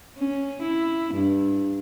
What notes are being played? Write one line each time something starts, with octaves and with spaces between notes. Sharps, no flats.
C#4
E4
G2